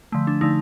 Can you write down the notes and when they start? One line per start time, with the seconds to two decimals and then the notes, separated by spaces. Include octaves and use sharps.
0.12 D3 F3 A3
0.27 D4
0.41 D3 F3 A3 D#4